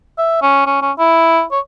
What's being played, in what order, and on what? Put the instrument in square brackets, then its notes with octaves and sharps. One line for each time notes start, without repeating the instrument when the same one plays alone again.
[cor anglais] E5
C#4
C#4
C#4
E4
C#5